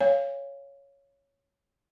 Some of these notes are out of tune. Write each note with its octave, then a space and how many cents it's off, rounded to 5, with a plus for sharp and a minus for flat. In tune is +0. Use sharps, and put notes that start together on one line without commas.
C#5 +0 F5 -15 G#5 -30